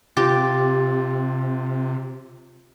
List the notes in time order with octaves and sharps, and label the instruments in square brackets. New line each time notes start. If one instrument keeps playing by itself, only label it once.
[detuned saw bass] C3 [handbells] F4 A6 [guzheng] G4